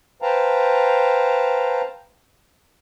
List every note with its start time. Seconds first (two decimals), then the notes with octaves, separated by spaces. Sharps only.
0.22 B4 C5 F5 G5 A5 A#5